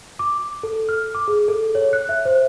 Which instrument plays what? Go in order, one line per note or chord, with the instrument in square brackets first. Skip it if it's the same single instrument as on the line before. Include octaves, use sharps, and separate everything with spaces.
[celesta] D6
A4
F6
D6
G#4
A4
C#5
F#6
E5
C5